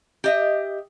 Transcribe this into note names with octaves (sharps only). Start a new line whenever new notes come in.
G4 D#5 E5